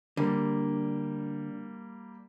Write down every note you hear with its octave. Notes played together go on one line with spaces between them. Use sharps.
D3 G3 A#3